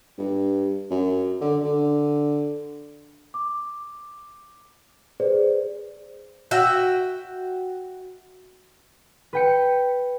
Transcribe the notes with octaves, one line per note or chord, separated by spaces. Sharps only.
G2
F#2
D3
D3
D6
G#4 B4 C5 D5
F#4 E5 G5
B4 G5 C#7